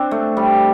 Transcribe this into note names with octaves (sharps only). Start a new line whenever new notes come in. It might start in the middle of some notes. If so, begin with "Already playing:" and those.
Already playing: C4 D4
A3
G3